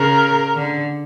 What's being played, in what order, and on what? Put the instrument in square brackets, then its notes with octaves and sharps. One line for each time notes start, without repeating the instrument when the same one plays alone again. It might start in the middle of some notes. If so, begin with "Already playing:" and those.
Already playing: [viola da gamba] C#3 [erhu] A#4
[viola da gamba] D3